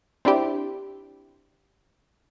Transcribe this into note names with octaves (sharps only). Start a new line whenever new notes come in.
C4 D4 E4 G4